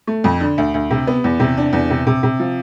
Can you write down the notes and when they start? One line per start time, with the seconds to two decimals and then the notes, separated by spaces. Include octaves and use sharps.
0.07 A3
0.24 F2
0.40 D3
0.58 D2
0.74 D2
0.91 C3
1.07 B3
1.24 E2
1.40 C3
1.57 D4
1.73 E2
1.90 C3
2.07 C3
2.23 C3
2.40 F3